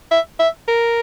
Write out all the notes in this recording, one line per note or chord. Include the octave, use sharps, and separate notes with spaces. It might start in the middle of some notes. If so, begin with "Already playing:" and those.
E5
E5
A#4